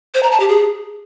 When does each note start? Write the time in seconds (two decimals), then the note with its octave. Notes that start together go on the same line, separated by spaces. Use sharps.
0.14 C5
0.23 A#5
0.31 A5
0.40 G4
0.48 G#4